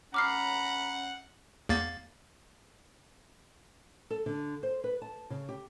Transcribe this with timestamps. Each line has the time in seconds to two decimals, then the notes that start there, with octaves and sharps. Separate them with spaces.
0.14 C#4 F#5 A#5 B5 D6 F6 C7
1.69 E2 A#3 A6
4.10 A4
4.26 D3
4.63 C5
4.84 B4
5.02 A5
5.30 C#3
5.49 G4